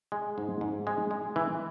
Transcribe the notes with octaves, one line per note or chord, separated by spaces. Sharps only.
G#3
G#2
G#2
G#3
G#3
E3